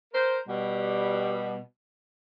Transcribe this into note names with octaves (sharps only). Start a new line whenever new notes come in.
A#4 C5
B2 G3